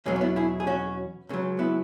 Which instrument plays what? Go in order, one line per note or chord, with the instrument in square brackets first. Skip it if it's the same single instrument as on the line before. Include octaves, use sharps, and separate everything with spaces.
[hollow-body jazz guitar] E2 B2 F#3 G#3 C#4
C#4
B3 E4
E4 G#4
G#4
C#4 F#4
C#2 C#3 F#3
B3 E4